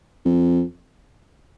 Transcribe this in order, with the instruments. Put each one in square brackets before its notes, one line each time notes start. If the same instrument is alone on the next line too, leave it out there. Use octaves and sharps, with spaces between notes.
[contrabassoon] F2